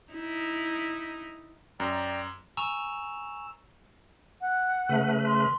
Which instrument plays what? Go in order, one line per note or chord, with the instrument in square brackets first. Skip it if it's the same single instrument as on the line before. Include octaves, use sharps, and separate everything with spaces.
[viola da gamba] D#4 E4
[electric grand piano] F#2 [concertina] D5 G5 A#5
[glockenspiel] G#5 A#5 C#6 E6 E7 F7
[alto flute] F#5
[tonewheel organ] C#3 A3 B4
[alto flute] C6